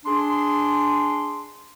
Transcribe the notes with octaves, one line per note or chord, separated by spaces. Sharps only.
D4 G#4 C6